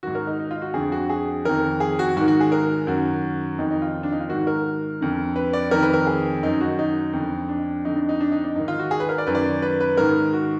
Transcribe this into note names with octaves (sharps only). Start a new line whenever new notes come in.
G#2 D#3 F#4
A#4
D#4
D#4
F4
F#4
F2 D3 G#4
F#4
G#4
F2 D#3 A#4
G#4
F#4
G#2 D#3 F#4
F#4
G#4
A#4
F#2 D#3 F#4
F2 D#3 D#4
D#4
F4
D4
D#4
F4
G#2 D#3 F#4
A#4
F2 D3
B4
D5
F2 D#3 A#4
B4
A#4
G#4
F#2 D#3 D#4
F#4
D#4
F2 D3
D4
F2 D3 D#4
D4
D#4
D4
D#4
D4
G#2 D#3 D#4
F4
F#4
G#4
B4
A#4
D5
F#2 D#3 B4
D5
B4
B4
G#2 D#3 A#4
F#4